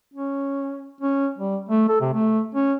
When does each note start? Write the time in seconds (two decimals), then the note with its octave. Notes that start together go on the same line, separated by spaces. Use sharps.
0.14 C#4
1.01 C#4
1.38 G3
1.69 A3
1.89 A4
2.01 C3
2.14 A3
2.55 C#4